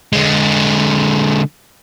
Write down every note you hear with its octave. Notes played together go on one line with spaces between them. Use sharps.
D3 G#3